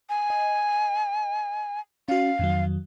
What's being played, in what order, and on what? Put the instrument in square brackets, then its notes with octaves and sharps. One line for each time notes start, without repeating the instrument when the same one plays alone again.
[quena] G#5
[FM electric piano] D#5
[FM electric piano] C#4 F#4 [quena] F5
[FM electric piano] F2 D#3 F#3